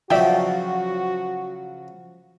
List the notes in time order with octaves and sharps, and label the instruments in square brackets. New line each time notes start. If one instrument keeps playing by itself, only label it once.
[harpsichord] C#3 F#3 [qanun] F3 [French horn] F#4 [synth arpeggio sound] D5 E5 G5